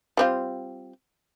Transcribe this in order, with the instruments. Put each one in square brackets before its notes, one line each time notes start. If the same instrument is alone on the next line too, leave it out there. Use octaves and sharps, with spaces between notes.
[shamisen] G3 C4 F4